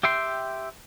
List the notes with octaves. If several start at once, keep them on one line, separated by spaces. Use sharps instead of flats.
G4 E5 G5 C6